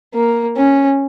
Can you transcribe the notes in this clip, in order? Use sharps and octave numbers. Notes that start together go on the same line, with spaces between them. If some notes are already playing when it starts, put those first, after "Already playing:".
A#3
C#4